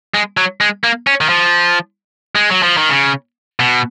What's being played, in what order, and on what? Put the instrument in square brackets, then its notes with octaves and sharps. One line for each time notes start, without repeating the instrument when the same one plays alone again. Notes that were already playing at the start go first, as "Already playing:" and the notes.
[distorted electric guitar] G#3
F#3
G#3
A#3
C#4
D#3
F3
G#3
F#3
F3
D#3
C#3
B2